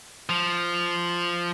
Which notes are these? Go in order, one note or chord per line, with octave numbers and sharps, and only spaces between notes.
F3